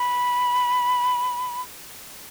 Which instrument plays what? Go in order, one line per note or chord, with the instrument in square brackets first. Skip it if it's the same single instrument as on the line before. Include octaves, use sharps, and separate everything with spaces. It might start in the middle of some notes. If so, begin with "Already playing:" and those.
Already playing: [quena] B5